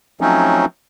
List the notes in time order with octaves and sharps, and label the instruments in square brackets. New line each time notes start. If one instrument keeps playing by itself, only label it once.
[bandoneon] F3 F#3 A3 C4 C#4 D#4